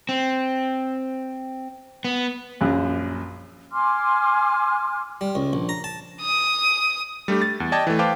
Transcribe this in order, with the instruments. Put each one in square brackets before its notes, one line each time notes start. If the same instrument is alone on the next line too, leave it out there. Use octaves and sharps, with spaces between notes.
[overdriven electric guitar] C4
B3
[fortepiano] A#1 F#2 F#6
[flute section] G#5 C6 D6 F6
[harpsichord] G3
C#2
A#1
A#5
A5
[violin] D#6
[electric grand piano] G3 A3 D4 G4
A6
E2
D5 D#5 G5 A5 G#6
E3 A3
B4 C5 F5 G5 A5 D6